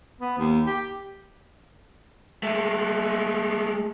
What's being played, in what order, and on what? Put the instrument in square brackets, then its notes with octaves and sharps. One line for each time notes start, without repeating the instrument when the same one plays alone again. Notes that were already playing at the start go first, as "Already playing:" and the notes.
[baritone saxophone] B3
D#2
G4
[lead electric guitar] G#3 A3